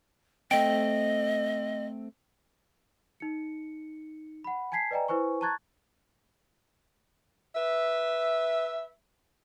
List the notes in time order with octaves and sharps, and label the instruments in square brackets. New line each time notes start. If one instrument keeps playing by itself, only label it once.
[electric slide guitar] A3 C4 [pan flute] D#5 [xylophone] G5
[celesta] D#4 C#7
F#5 B5
G#5 A5 G#6 B6 C7
B4 D5 D#5 G5 G#5 A#5
E4 B4 C5 G#5 C#6
A5 A#5 C#6 F#6 G#6 A6
[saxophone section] B4 E5